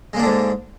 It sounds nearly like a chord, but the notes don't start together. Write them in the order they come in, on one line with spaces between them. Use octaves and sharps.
G#3 A#3 D4 D3 G#2